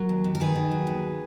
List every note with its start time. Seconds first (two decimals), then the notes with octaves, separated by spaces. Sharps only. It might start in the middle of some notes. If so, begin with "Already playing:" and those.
Already playing: F#3 A#4
0.09 D#2
0.24 D#2
0.35 A#4
0.40 D#3 G#4 B4
0.55 D#3
0.71 F#3
0.87 D#2